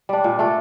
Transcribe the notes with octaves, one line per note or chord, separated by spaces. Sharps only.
G3 D4
A#2
A3 D4 A4